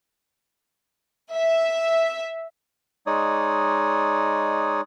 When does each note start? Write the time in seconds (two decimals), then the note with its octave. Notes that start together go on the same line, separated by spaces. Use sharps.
1.35 E5
3.07 G#3 D#4 C#5 D5 D#6